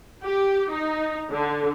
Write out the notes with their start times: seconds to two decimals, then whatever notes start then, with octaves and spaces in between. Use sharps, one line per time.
0.24 G4
0.71 D#4
1.31 D3